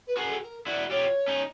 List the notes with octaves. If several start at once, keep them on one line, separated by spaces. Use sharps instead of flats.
B4
F#4 G#4 A#4
A4
A#4
E4 F#4 D5
F4 G4 C#5
C#4 D#4